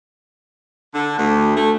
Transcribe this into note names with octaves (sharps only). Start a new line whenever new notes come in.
D3
D2
A3